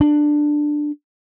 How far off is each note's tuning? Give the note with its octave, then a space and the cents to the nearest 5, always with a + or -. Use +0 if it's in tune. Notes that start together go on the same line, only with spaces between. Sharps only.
D4 +10